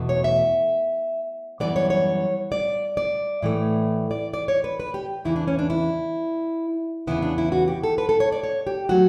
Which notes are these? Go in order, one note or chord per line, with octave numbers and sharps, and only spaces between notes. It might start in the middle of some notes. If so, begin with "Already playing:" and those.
Already playing: E2 B2 A3
C#5
E5
F#2 E3 G3 B3 D5
C#5
C#5
D5
D5
A2 E3 A3
D5
D5
C#5
B4
B4
G4
E2 C#3 E3 E4
D4
C#4
D4
E4
E2 C#3 E3 B3 E4
D4
E4
F#4
G4
A4
B4
A4
C#5
D5
C#5
G4
F#3 A3 F#4